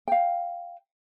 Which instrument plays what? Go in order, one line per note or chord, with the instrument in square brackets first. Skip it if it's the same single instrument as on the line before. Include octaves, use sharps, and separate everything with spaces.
[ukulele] F5 G5